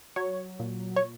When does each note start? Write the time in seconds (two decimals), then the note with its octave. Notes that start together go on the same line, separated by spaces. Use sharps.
0.16 F#3 C#5
0.60 A#2
0.96 C#5